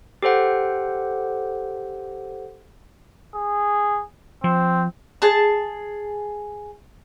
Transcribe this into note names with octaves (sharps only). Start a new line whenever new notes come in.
G4 A4 C5 F#5
G#4
F3 C4
G#4 A5